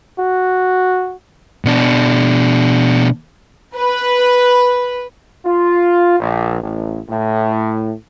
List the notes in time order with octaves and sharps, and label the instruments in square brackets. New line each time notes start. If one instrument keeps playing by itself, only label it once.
[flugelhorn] F#4
[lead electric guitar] B2 D4
[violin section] B4
[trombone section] F4
A#1
A1
A2